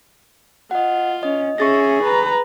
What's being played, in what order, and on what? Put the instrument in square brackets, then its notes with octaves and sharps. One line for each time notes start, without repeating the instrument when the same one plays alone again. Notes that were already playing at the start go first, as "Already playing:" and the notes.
[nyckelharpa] F4 [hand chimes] D#5 F#5
[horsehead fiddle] C#4 [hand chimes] D#5
[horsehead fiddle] C#4 E5 [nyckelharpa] G#4 [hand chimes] C#6 A6 A#6
[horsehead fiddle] B4 A#5